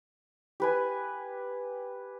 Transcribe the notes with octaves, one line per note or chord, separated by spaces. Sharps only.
G4 B4 G#5